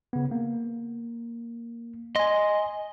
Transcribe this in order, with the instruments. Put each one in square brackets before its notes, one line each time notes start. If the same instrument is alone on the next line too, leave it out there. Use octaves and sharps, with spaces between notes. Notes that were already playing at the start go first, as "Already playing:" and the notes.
[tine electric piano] C#3 B3
A#3
[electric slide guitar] D#5 [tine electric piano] G#5 C6